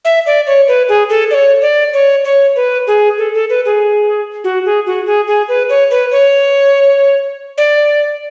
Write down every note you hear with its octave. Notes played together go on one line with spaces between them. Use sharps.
E5
D5
C#5
B4
G#4
A4
D5
C#5
D5
C#5
C#5
B4
G#4
A4
A4
B4
G#4
F#4
G#4
F#4
G#4
G#4
B4
C#5
B4
C#5
D5